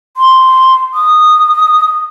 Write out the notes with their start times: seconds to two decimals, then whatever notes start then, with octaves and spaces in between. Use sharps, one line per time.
0.17 C6
0.94 D#6